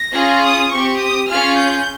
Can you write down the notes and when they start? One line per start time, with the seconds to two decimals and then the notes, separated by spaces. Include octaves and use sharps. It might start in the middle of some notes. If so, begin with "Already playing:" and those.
Already playing: A#6
0.14 C#4 F4 G#4
0.42 D#6
0.71 C4 G4 C#6
1.00 D#6
1.29 C#4 F4 G#4 F6
1.57 G6